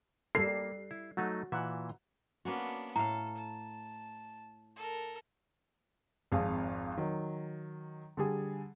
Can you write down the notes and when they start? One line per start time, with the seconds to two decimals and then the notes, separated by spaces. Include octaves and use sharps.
0.35 G3 A#3 A4 C7
0.91 E4
1.17 F#3 A3 D#4 F#4
1.52 A#2 E3 E5 F#5
2.45 A#3 B3 C#4 D4 F#4
2.96 A2 A4 F5 A#5
3.37 A5
4.76 A4 A#4
6.32 G#1 F2 G#4 F5
6.97 D#3 F#3
8.17 D3 G3 G#4